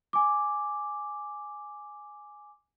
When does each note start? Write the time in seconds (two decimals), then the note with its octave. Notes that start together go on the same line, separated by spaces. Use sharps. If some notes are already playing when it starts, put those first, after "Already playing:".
0.13 G#5 D6